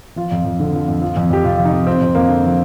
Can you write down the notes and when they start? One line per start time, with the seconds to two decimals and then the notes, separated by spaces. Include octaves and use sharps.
0.16 F3 F4
0.32 F2
0.45 F2
0.60 D3
0.73 F3
0.88 F2
1.02 F3
1.17 F2
1.30 F2 G4
1.44 C3 F4
1.58 F3
1.65 D#4
1.73 F2
1.87 F3 C4
2.02 F2
2.15 F2 A#3
2.29 D3
2.44 F3